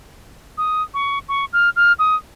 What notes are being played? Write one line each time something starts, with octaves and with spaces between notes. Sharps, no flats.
D#6
C#6
C#6
F6
F6
D#6